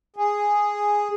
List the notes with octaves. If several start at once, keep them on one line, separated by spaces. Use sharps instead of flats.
G#4